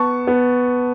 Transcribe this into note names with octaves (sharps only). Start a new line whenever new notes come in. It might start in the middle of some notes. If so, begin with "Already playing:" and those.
Already playing: B3 A5 C#6
B3